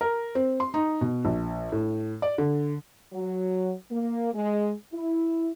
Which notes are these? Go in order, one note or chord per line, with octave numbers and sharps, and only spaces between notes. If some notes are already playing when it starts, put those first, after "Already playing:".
A#4
C4
C6
D#4
B2
A#1
A2
D5
D3
F#3
A#3
G#3
E4